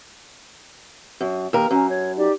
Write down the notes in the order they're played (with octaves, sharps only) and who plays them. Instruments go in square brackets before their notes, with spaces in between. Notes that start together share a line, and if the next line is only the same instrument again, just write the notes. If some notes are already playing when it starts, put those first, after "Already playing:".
[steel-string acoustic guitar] F#2
D#2 A#4
[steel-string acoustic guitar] F#2 [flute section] C#4 A#5
[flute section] C#5
D#4 G4 D5